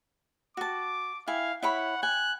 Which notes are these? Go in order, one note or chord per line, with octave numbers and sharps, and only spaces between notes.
F#4 A5 D6
E4 F5 G#5
E4 C#5 F#5 B5
G#5 F#6